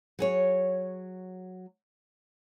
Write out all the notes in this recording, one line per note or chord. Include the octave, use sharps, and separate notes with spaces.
F#3 G#4 C#5